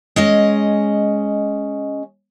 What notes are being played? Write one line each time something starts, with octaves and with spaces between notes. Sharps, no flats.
G#3 C#4 D#5